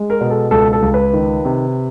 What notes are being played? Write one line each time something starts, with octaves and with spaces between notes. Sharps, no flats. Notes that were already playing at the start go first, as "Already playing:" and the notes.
Already playing: G#3
A#4
B2
A4
C#2 A4
A4
C#2
B4
D#3
C3